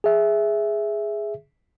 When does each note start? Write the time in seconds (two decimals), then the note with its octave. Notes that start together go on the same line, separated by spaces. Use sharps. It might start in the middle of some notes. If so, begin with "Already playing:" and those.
0.04 G#4 E5